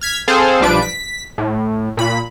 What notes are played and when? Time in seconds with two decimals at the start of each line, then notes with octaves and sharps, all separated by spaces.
0.01 F6 G#6 B6
0.28 C4 G#4 A4 C5 F5
0.60 B1 F3 G3 D4 B4 D7
0.82 B6
1.38 A2
1.97 A#2 B5